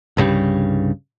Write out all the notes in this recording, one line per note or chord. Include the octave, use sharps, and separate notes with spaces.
C2 G2 C#3 G3